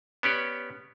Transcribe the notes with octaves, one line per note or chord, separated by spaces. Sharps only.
B3 C#4 G4 D5